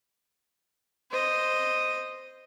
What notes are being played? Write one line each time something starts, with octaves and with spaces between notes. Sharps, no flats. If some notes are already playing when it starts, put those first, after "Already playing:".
C5 D#5